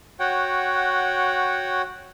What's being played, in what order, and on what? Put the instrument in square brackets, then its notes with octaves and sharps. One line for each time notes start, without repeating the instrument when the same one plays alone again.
[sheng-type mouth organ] F#4 C#5 F#5 G5